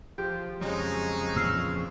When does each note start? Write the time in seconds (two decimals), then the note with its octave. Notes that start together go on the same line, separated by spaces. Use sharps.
0.18 F3 G4
0.61 F2 C#3 F#3 G#3 D#4
1.36 A#2 E3 F3 E6 F6 C7